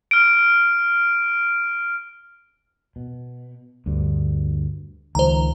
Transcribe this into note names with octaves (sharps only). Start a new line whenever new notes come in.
F6 D7
B2
D2 G2
C#2 D#3 F3 C5 A#5